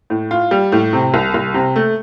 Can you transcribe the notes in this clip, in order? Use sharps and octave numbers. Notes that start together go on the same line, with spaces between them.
A2
F4
G3
A2
C3
C2
C2
C3
A3